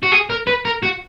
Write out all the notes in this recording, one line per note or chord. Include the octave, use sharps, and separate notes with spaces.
F#4
G#4
A#4
B4
A#4
F#4